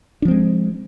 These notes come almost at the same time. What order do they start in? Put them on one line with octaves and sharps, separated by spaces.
D4 F3 C4 G#3